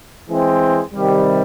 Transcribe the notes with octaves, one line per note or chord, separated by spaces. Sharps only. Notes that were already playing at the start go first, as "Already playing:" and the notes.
E3 G#3 C4
C3 D#3 G3